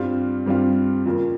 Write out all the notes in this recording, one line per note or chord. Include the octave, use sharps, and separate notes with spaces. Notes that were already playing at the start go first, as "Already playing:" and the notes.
Already playing: G2 G3 C4 F4
G2 G3 C4 F4
F2 C#3 F3 A#3